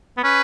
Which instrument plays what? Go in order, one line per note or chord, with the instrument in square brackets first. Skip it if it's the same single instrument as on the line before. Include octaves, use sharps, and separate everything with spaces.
[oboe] B3
[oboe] C#4 [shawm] B4